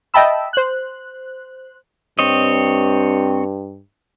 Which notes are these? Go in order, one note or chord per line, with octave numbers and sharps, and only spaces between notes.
D#5 E5 G5 A5 B5 E6
C5 F#6
G2 C4 C#5 D#5